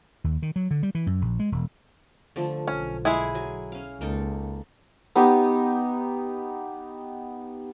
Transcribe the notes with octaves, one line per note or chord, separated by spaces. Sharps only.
D#2
D#3
F#3
D3
G3
E3
F#2
A#1
G#3
E1
D3 F3 A3
B1 C#4
G#3 E4 G#4
F#3 G#5
C#4 F5
C#2 A#3 D#4 A4
B3 D#4 G4